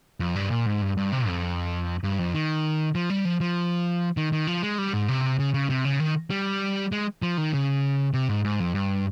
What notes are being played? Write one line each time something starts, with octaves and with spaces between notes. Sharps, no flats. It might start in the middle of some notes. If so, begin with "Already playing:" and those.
F2
G2
A#2
G#2
G2
G2
C3
F2
G2
F2
D#3
F3
G3
F3
F3
D#3
D#3
F3
G#3
G3
G#2
C3
C#3
C#3
C3
C#3
D#3
G3
G#3
F3
D#3
C#3
C3
G#2
G#2
F2
G2